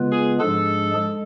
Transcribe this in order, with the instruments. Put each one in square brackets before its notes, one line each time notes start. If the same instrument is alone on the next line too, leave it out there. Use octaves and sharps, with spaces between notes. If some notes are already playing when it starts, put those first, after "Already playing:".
Already playing: [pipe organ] C#3 G#3 B3 F4 B4
[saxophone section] G#4
[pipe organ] G#2 F3 G#3 D4 G#4 [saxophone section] A4
[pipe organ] G#3